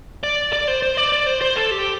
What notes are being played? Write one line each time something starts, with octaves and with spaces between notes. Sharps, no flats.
D5
D5
C5
C5
D5
D5
C5
C5
A4
G4